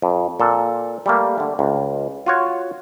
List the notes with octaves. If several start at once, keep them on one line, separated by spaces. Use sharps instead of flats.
F2
A#2 A4
G3 A3 A#3
D3 A3
C#2
F4 F#4 C#5